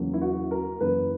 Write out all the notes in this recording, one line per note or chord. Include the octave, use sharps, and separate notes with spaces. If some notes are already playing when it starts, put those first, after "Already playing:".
Already playing: E2 C#3 F#3 A#3
E4
F#4
A#4
F#2 C#3 E3 A#3 B4